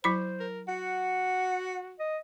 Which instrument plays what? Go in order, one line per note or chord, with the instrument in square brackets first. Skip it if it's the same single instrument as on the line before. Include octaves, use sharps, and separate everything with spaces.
[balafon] F#3 E4 B5 [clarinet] C5
[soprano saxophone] A#4
[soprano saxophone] F#4 [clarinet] F#5
[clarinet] D#5